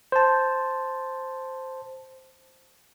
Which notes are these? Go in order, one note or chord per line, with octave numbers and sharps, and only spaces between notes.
C5 A5